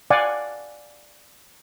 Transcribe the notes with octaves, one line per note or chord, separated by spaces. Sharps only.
D5 F5 F#5 G#5